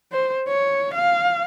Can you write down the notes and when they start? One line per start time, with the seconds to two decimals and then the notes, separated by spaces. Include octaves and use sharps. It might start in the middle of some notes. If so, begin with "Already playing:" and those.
0.12 C5
0.48 C#5
0.95 F5